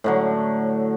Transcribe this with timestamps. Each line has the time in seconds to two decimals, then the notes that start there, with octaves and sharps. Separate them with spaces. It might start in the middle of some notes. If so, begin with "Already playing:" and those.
0.04 A2 D3 F#3